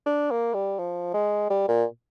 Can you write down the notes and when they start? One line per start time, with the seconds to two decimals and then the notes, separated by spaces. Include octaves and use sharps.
0.06 D4
0.31 A#3
0.54 G3
0.79 F3
1.14 G#3
1.50 G3
1.68 A#2